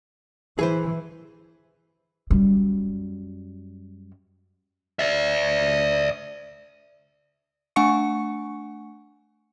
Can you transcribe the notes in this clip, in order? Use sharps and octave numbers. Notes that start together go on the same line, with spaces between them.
E3 G#4 B4 C5
F#2 G3
D5 E5
A3 D4 F#5 G#5 C#6 C#7